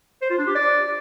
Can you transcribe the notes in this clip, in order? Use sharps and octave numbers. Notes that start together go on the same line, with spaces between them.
C5
F4
D4
G4
D5